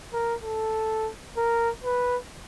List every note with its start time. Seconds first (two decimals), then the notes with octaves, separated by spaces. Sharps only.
0.13 A#4
0.44 A4
1.37 A#4
1.84 B4